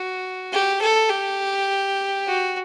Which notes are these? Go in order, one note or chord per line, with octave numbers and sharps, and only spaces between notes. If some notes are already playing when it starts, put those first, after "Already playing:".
Already playing: F#4
G4
A4
G4
F#4